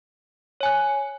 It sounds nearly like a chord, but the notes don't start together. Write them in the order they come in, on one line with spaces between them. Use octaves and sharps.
C#5 G#5 F#6